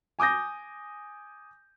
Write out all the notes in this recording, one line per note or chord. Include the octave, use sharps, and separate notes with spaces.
G#5 D6 D#6 G6 A#6